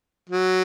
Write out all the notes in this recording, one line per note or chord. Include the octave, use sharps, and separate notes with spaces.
F#3